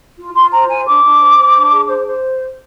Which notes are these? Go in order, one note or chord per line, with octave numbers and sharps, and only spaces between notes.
F4
F4 C6
C5 A#5
F4 G#5
D4 D6
D4
C5
C5
D4
G#4
C5
C5